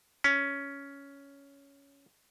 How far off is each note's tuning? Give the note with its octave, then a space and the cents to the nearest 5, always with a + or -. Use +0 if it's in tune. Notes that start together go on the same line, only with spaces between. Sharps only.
C#4 +10